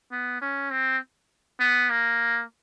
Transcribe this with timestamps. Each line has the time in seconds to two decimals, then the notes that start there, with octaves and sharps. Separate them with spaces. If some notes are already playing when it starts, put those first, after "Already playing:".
0.12 B3
0.42 C#4
0.71 C4
1.60 B3
1.90 A#3